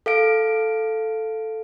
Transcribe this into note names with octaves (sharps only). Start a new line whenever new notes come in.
A4 F5 D7